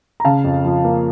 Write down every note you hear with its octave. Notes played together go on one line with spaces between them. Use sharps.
A#5
C#3 F5 A5
F2
F3
A#3